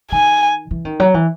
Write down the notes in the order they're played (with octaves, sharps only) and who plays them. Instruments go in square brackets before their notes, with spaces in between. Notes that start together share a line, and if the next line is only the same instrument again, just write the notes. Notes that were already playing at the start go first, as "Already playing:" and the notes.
[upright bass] D#3 [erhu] G#5
[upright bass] E3
D#3
F#3
E3